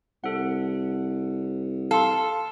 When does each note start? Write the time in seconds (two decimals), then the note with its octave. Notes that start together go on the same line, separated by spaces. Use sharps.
0.24 C2 A4 F#5
1.91 A4 F5 C6